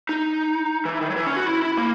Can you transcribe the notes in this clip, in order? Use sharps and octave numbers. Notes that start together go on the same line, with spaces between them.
D#4
E3
D#3
F#3
E3
C#4
F#4
E4
E4
A#3